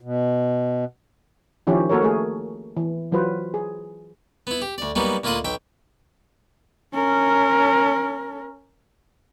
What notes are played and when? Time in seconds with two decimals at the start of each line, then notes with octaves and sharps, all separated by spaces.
0.01 B2
1.67 D#3 F3 C#4 E4 G4
1.89 A#3 F#4 A4 A#4 C#5
2.03 A3 G#4
2.77 E3
3.12 E3 F#3 F4 B4 C5
3.54 G#4
4.47 B3 E4
4.62 G4
4.78 D2 D5
4.96 F#3 G3 A#3 B3 D#4
5.24 D2 A#3 E4 F4 D#5 F#5
5.45 B1 E5 G5
6.94 C#4 A#4